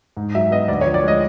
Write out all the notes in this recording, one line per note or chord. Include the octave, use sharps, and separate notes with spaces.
G#2
F#3 E5
B3 D#5
D2 D5
C#5
F3
D5
G#3 D#5